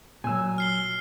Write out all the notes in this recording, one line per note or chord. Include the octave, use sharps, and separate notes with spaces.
A#2 F#3 G#5 E6
F6 C7 G7